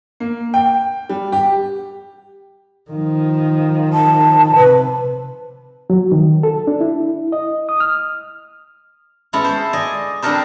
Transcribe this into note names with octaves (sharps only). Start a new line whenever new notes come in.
A#3
G5
G3
G4
D#3 F3
A5
C3 B4
F#3
D#3
A4
D4
E4
D#5
D#6
F6
G#3 B3 C#4 E4 A4
C5
D5 D#5 G#5
G3 C4 D4 A4 A#4 C5